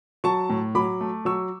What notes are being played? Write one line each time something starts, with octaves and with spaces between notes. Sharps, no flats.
F#3 A5 C#6
A2
F#3 B5 D6
A3
F#3 C#6 E6